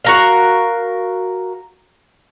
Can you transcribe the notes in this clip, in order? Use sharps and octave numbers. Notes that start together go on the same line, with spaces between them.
F#4 A#4 F5